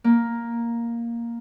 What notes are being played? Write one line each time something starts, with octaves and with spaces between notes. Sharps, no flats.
A#3